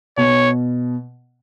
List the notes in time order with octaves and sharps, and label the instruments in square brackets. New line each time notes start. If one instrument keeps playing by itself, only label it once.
[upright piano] B2 [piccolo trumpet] C#5